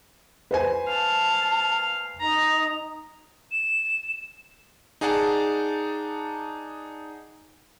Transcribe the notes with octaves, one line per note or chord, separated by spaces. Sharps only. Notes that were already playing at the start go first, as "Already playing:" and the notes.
B4 C5 G#5
F5 A5
D#4 A#5
E7
D#4 G#4 D5 F#5 A5